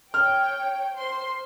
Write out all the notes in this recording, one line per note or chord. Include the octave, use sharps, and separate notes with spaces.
C#5 G5 F6
C5 C6